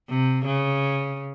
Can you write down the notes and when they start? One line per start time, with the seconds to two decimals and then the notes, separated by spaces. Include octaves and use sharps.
0.09 C3
0.45 C#3